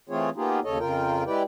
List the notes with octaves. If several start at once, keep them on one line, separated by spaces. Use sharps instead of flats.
E3 A3 C4 F4 G#4 C#5
A#3 B3 D#4 F4 G4 G#4
D#2 C#3 A4 C#5 D#5
F2 C#3 F4 A#4 G5
G#3 E4 G4 B4 D5 G5